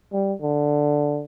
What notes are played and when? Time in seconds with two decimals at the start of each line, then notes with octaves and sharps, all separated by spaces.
0.13 G3
0.41 D3